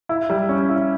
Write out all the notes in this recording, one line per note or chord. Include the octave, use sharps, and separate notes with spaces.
E4
G3
C#4
E4